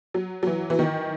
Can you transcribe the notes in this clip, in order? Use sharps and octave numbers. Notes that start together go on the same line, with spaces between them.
F#3
F#3
E3
E3
D#3